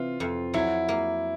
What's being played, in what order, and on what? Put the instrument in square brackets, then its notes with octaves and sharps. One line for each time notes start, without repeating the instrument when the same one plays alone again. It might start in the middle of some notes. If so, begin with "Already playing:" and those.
Already playing: [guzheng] C3 E3 [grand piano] F4
[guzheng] F2
[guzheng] F#3 [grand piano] E4
[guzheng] A#3